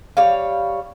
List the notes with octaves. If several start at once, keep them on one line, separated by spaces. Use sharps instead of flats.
G3 C#5 F5